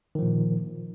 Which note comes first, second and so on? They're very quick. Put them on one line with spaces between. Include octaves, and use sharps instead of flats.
D#3 F3 A#2